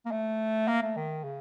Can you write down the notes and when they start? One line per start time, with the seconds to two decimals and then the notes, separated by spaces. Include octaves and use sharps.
0.06 A#3
0.11 A3
0.68 A#3
0.82 A3
0.96 D#3
1.24 C#3